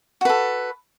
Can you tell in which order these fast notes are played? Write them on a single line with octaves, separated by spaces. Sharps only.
F#4 B4 A4